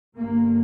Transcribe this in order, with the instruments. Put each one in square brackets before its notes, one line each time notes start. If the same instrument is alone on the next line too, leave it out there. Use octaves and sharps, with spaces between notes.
[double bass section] G1 G2 A#3